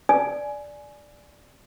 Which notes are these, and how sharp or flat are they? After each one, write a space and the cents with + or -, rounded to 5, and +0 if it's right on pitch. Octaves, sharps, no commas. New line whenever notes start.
D5 +0 G#5 +15